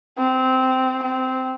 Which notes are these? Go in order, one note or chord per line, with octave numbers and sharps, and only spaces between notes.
C4
C4